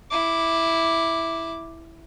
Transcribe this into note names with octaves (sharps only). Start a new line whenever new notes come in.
E4 D6